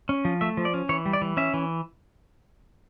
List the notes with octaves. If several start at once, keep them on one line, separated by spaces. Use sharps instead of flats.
C#4
F3
A3 E5
F3
D5
C#4
E3 C#5
G3
D5
E3
C#4 E5
E3